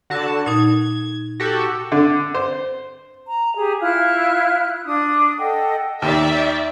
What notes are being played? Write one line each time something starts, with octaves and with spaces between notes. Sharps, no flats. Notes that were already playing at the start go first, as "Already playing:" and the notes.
D3 F#4 A5
A#2 D#4 G#6
F#4 G4 A4
D3
C5
A#5
G4 G#4
E4 F4 F6 F#6
D4 D#6
A4 D#5 F#5 G5
D#2 D#3 D5 E5